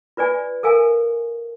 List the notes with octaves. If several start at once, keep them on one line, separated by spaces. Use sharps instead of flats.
F4 B4 D5 G#5
A4 A#4 F5 G#5